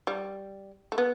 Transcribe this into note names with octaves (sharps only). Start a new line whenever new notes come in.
G3
A3
B3